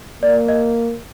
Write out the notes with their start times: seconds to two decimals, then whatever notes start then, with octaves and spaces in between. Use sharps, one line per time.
0.22 A#3 D5
0.48 D#5